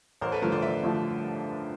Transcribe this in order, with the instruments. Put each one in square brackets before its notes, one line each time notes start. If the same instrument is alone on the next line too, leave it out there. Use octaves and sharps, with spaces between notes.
[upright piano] A1 [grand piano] A#4 C5
[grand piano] A4 B4
[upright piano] G2 D3 F3 A3 [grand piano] A#4 C5
[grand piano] C5 D5
[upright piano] A1 [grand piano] D5 E5
[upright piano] D3 F3 A3